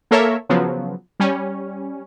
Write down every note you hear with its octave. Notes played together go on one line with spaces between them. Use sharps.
A#3 A4 A#4 C#5 E5
C#3 F3 F#3 B3
G3 C#4